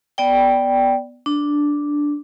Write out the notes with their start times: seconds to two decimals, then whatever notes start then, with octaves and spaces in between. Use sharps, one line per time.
0.18 B3 D5 G5
1.26 D4